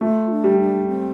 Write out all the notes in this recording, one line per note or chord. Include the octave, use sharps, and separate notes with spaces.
A3 F4
D4
G3
D4
C4